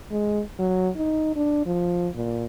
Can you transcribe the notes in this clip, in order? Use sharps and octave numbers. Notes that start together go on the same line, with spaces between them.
G#3
F#3
D#4
D4
F3
A#2